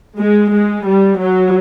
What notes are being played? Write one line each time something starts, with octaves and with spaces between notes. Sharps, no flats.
G#3
G#3
G3
F#3